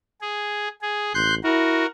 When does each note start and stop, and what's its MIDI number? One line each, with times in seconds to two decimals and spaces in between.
0.21 0.68 68
0.82 1.12 68
1.14 1.43 33
1.14 1.34 84
1.14 1.34 90
1.14 1.34 91
1.44 1.85 64
1.44 1.86 66
1.44 1.86 70